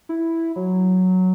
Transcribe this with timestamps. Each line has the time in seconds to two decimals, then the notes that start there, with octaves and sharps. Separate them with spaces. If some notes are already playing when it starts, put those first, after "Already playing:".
0.09 E4
0.56 F#3